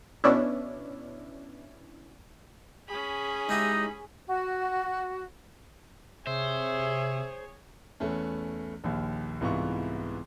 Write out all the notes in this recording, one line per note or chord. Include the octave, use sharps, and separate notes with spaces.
B2 C#4 D4 E4
C#4 G#4 B5
G#3 D#4 E4 G4
F#4
C3 G#4 C5 C#5 E5
E2 A3 B3 C#4
A#1 D#2
C2 G#2 E3 B3 F4 C#6